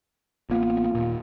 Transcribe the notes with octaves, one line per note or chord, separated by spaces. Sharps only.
A1 A#3 B3 F4
D#1 A#2